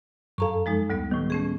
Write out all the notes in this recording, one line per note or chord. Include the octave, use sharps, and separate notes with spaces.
F#2 A4 F5 A#5 C#6
F3 G#3 D#4
D2 G3 B3
A2 D#3 G3 B3
A3 C#4 G#4